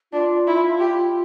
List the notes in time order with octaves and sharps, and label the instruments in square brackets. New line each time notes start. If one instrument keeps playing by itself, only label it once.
[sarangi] D4 [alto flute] F4
[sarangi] E4
G4